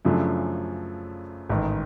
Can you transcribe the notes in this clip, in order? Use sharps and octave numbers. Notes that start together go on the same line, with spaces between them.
F#2 C#3 F3 A3 D4
A1 G#2 D#3